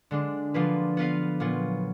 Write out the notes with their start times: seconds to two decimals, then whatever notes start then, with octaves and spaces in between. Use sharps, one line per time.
0.11 D3 G#3 D4
0.54 D3 F3 A#3 F4 B4
0.97 B3 F4 B4 F5
1.40 A#2 F#3 B3 F4